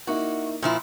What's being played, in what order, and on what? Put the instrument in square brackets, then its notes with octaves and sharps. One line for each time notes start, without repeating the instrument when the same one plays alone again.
[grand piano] A#3 D#4 E4 [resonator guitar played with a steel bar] F#4
[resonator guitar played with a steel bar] A#2 F3 E4